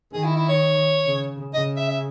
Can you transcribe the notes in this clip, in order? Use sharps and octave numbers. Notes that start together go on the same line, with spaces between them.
D#3 G#4
E4
E4
C#5
C#3
C#3 D#5
E5
E5